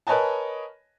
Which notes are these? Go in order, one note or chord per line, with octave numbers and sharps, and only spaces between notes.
A#4 B4 C#5 D#5 G#5 A5